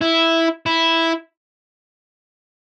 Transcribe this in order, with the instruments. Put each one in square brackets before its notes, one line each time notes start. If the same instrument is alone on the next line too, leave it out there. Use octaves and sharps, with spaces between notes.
[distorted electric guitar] E4
E4